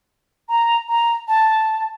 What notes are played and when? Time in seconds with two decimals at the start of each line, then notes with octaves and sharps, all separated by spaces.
0.49 A#5
0.88 A#5
1.28 A5